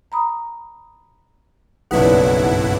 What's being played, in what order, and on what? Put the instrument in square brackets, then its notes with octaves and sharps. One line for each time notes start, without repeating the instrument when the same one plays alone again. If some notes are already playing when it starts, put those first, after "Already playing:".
[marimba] A#5 B5 D#6
[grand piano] F#1 B1 [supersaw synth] G2 E4 F#5 [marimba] D#4 B4 D5